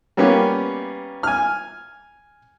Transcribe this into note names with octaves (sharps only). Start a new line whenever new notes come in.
G3 A#3 B3 C#4 G4
G#5 F6